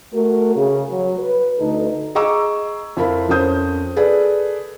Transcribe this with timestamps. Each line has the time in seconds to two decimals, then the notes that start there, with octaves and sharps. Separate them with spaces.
0.13 A3 F#4 A#4
0.56 C#3
0.90 F#3
1.19 B4
1.59 D2 D#4 A4
2.15 G#4 D#5 A#5 C#6 D6 E6
2.97 F2 E4 F4 A#4 B5
3.29 F2 C#4 A#4 C5 D#6 G6
3.96 G#4 A4 B4 D5